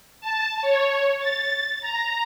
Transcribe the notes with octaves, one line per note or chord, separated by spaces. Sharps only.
A5
C#5
A6
A#5